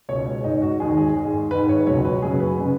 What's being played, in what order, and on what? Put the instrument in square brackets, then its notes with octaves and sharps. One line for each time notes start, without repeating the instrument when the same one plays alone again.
[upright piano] C#2 B2 G#3 C#5
C#5
G#2 G#3 D#4
F#4
D#2 D#3 G#3 G#4
G#4
G#2 G#3
G#2 D#3 G#3 B4
C#5
C#2 B2 F#3 C#5
B4
F#2 C#3 F#3 G#4
B4
C#3 G#3